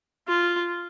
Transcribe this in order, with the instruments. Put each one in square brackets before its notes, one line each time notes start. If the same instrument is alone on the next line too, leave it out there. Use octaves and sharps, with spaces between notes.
[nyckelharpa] F4